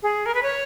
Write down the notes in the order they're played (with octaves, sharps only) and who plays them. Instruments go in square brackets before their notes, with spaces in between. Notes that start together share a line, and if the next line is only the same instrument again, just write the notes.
[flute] G#4
A#4
B4
C#5